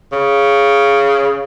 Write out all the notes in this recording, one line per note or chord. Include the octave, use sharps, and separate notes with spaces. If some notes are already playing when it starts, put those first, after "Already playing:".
C#3